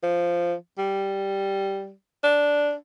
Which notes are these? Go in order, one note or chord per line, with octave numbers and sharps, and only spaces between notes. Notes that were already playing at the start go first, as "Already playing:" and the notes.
F3
G3
D4